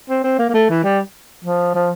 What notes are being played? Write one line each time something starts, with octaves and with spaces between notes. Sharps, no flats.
C4
C4
A#3
A#3
A3
E3
G3
F3
F3